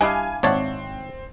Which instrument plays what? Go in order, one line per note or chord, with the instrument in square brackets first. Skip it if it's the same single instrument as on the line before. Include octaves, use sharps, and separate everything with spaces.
[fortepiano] G3 D#5 [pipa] D4 E4 F5 [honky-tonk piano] G#5
[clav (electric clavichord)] G#1 C#5 A5 [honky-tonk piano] C4 [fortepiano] D5 E5 F#5